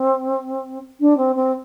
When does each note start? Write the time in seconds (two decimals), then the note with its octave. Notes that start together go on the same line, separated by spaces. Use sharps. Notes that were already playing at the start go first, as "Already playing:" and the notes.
Already playing: C4
1.00 D4
1.17 C4
1.36 C4